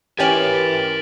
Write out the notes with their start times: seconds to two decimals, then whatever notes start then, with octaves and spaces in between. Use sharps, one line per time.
0.19 E3 C#4 G4 A#4 G#5 A6 B6 F#7